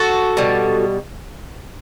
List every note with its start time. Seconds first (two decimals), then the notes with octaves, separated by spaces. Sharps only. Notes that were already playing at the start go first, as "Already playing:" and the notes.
Already playing: F#4 A4
0.37 B2 G3